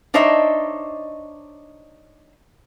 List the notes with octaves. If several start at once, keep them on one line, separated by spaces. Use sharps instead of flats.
D4 D#4 C5 C#5 D#5 E5